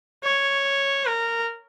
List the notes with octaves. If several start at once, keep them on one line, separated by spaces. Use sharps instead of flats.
C#5
A#4